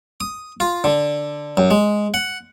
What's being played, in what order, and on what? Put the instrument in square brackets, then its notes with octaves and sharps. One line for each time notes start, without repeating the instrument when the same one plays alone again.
[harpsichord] D#6
F4
D3
F#2
G#3
F#5